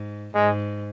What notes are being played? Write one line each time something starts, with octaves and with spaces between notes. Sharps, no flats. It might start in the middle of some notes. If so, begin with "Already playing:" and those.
Already playing: G#2
G#2 G#3